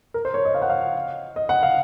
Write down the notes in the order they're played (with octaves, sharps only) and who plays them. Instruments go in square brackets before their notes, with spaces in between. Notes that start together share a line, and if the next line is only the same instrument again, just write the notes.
[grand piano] A#4
C5
C#5
D#5
F5
F#5
F5
D#5
F#5
F5